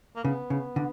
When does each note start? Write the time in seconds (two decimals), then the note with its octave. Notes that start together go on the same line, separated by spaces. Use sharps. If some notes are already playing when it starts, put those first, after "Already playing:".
0.16 A#3
0.24 C#3 B3
0.50 C#3
0.76 D3